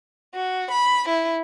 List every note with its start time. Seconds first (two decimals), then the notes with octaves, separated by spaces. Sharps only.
0.35 F#4
0.71 B5
1.09 E4